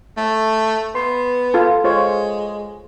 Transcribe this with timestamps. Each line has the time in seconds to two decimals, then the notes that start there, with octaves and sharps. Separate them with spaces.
0.17 A3
0.95 B3 C6
1.54 F4 A4
1.84 G#3 F4 C5 C#5